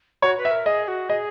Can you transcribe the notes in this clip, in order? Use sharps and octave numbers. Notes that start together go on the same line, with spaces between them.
F#4 C#5
B4
E5
A#4
G#4 D#5
F#4
G#4 D#5